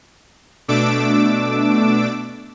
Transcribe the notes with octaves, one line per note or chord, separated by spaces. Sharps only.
B2 A3 D4 D6 E6